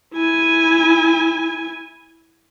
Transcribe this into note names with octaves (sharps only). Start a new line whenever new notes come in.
E4 G#5